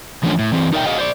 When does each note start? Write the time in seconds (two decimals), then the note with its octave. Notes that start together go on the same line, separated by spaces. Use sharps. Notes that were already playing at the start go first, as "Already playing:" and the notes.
0.23 E3 F3 A3 C#4 D4
0.39 A2
0.52 E3 C4
0.72 D#4 A#4 D5 E5 G5
0.86 F#4 G#4 D#5 F5 F#5
0.98 C5 D5